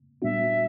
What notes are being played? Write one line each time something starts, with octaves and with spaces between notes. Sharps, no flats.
A#2 G3 B3 D4 F#4 E5